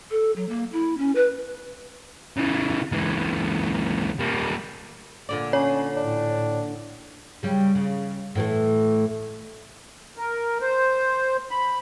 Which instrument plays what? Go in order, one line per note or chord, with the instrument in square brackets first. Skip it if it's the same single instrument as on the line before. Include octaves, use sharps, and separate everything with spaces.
[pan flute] A4
F#3
A#3
E4
C#4
B4
[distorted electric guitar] C#3 E3
C#2 E3
G3 A#3
[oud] A#2 D3 D5
[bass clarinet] C#4 [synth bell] C#5
[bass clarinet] A2 [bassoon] D4
[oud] C#3 G3
C#3
A2 E3 A3
[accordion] A#4
C5
B5